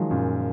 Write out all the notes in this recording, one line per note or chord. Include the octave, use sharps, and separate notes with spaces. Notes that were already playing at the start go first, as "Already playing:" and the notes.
Already playing: D#3 F3 F#3 G#3
F#2 A#2